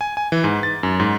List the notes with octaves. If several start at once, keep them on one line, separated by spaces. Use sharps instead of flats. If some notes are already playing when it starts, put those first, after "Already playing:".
G#5
G#5
E3
G#2
A6
F#2
G#2